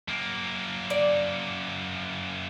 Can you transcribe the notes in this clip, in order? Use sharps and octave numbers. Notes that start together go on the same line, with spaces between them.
F#2 A#3
D5